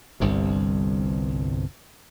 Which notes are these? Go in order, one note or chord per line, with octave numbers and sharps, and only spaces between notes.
G1 C2 G2 C3